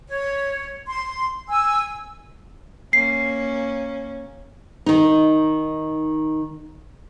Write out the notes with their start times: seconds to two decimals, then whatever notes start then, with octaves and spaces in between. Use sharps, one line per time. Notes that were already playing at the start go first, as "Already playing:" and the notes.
0.09 C#5
0.87 C6
1.49 G#5 E6
2.93 A#3 C#4 C7
4.86 D#3 D#4